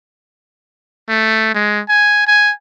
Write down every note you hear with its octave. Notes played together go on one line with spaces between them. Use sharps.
A3
G#3
G#5
G#5